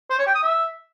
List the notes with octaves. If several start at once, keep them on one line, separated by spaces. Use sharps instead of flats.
C5
C#5
G5
D#6
E5